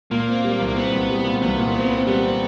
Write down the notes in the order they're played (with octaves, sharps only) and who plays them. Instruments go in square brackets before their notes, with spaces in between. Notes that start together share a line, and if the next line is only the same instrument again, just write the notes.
[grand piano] A#2 [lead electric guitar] A#3
[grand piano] C4
G3
C2
[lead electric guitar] A#3
[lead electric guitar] B3 [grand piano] C4
[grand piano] C2
G3
A#2
[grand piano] C2 [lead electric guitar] B3
[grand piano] A#2
C4
C4
[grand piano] G3 [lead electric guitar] B3
[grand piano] C4